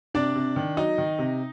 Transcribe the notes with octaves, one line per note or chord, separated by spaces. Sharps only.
C3 D4 D5
C3
D#3
F#3 D#4 D#5
D#3
C3